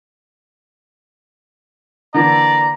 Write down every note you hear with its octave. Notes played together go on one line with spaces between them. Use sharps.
D3 E3 A#3 D5 A#5